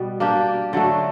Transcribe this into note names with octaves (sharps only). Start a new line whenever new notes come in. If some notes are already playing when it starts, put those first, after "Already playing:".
Already playing: B2 G3 B3
A#3 D4 G4
D3 F#3 A3